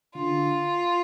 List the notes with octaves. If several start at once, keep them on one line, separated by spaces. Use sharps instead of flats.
D3 F4